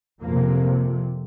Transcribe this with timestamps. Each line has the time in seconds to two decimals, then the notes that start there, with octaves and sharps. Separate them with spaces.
0.22 F2 C3 A#3